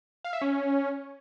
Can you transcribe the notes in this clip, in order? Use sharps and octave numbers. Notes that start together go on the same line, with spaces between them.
F5
E5
C#4